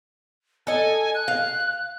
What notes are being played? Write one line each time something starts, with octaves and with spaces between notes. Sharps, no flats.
A4 D#5 G#5
F#6
F5